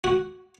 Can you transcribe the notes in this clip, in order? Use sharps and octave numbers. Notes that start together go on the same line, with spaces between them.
F#4